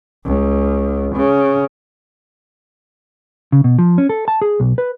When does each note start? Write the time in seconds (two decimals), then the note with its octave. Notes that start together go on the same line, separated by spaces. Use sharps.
0.25 C#2
1.15 C#3
3.52 C#3
3.64 B2
3.79 F3
3.98 C#4
4.09 A4
4.28 A5
4.42 G#4
4.60 B1
4.78 B4